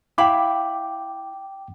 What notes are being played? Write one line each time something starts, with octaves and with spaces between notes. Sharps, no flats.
E4 F5 G5 B5 D6